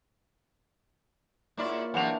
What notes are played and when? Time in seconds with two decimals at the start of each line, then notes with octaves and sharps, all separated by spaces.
1.57 G#2 A#3 E4 F4 C#5 D5
1.94 E2 C3 E3 F#3 D4 F#5 F7